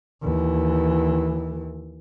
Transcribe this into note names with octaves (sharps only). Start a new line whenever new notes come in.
D#2 E3